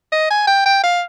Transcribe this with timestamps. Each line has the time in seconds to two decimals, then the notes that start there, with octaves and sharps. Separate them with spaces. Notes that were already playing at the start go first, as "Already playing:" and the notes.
0.12 D#5
0.30 G#5
0.47 G5
0.66 G5
0.84 F5